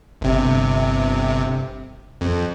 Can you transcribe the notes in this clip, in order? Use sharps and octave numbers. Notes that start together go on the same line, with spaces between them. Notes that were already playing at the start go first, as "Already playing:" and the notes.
G1 C3
F2